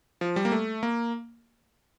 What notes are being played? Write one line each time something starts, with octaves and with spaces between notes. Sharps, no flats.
F3
G3
A#3
A3
A#3